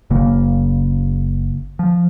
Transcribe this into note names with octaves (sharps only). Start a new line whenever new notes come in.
F#1 C#3 A#3
F3